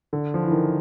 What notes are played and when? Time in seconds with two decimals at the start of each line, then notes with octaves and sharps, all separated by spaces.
0.13 D3
0.34 F3
0.43 E3
0.52 D#3